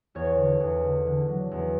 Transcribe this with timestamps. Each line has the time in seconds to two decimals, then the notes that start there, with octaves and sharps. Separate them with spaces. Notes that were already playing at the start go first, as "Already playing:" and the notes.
0.15 E2 C#5
0.37 D3
0.60 E2
0.83 D3
1.06 D3
1.28 F#3
1.51 E2